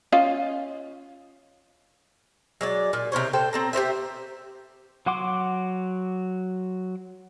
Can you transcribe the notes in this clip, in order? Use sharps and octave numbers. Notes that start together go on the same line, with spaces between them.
C#4 F4 D#5
F#3 G#3 D5
A#2
C3 A#4 C5 C#5
A4 C5 G5
C4 A4 A#5
G4 A#4 C5 E5
F#3 F#4 F#5 C6 D6